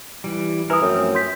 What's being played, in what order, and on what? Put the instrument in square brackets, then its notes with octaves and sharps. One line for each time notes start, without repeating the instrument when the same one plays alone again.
[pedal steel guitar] E3 G3
[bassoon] E3 [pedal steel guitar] E4 A#4 [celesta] G#5 D#6
[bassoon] F#2 [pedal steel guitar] F3 A3 C4
[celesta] C6 G6 B6